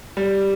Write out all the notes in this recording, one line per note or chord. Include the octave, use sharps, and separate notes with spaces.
G3